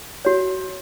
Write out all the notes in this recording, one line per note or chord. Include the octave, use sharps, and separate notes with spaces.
F#4 C#5